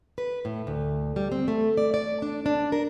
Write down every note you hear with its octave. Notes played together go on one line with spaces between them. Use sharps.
B4
A2
D2
G3
C4
A3
D5
D5
D4
D4
A#4